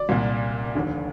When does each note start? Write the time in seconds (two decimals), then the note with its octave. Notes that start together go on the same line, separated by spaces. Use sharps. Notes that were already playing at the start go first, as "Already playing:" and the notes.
Already playing: D5
0.09 C2 A#2
0.75 F1 D#2 D3